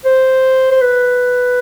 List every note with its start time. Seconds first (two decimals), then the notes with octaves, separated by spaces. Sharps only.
0.05 C5
0.71 C5
0.81 B4